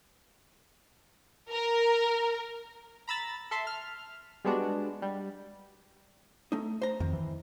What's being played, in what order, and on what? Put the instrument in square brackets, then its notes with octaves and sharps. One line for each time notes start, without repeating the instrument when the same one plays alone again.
[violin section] A#4
[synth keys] A#5 B5 E6 A6
A4 E5 C6
F6
G3 G#3 B3 D4 F#4
G3
[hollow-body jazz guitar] A3 D#4
C5 A#5
[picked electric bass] F2 [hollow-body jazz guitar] D#3
[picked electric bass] E3